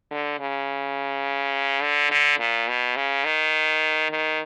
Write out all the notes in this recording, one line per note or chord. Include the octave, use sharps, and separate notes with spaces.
D3
C#3
D3
D3
A#2
B2
C#3
D#3
D#3